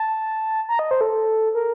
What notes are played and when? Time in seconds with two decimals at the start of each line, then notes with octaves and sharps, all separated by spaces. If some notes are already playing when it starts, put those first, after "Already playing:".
Already playing: A5
0.69 A#5
0.79 D#5
0.91 C5
1.01 A4
1.55 A#4